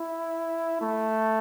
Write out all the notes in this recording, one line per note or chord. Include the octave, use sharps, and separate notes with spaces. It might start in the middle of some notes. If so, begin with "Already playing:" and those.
Already playing: E4
A3